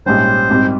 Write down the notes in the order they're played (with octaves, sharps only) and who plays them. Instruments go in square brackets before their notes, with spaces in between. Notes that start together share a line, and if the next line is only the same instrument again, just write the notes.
[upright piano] A#1 G#2 G3 C#4 [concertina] C5
[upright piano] G#1 G#2 G3 C4 G4